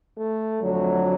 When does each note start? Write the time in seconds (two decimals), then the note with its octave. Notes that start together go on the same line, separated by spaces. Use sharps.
0.15 A3
0.59 F2 D3 F#3 A3